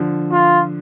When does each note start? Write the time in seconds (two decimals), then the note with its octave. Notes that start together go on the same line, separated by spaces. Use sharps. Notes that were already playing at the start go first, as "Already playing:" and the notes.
Already playing: D3 F3
0.32 F4